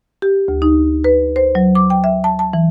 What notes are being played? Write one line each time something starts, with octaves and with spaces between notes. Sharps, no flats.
G4
D2
D#4
B4
C5
F#3
D6
G5
E5
A5
A5
E3